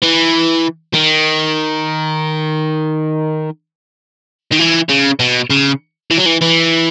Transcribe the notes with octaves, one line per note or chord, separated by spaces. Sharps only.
E3
D#3
D#3
E3
C#3
B2
C#3
E3
F#3
E3
E3